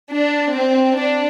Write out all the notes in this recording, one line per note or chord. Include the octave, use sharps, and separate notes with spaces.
D4
C4
D4